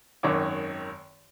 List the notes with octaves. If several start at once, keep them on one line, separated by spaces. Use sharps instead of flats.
G#1 F#2 D#3 C#5 D6